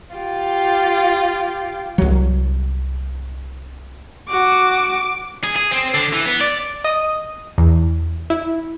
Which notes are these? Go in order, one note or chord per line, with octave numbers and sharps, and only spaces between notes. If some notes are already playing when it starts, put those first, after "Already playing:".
F4 G4
C2 F#3
F#4 D6
G#4
G#4
C4
D3
E3
B3
D5
D#5 D#6
E2
E4